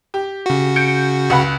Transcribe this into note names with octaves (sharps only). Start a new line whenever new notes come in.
G4
C#3 F#4
G6 C#7 D7
C#2 F#5 B5